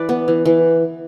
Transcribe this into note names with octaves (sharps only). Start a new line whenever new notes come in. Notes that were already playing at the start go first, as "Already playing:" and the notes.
Already playing: E3 B4 D5
B3
E3
E3